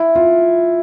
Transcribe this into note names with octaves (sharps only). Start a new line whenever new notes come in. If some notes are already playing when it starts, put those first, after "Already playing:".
Already playing: E4
F4